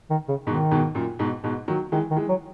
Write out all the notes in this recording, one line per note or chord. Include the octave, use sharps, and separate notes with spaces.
D#3
C#3
G#2 B2 D#3
G#2 B2
F#2 A#2
G#2 B2
G#2 B2
D#3 F#3
D#3 E3 G#3
D#3
E3 G#3
F#3